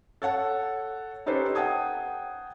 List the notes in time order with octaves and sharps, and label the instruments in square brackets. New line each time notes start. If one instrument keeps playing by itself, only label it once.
[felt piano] A4 C#5 F#5 A5
C#4 D#4 G4 A4 B4 C5
F#5 G5 A5 D#6 G#6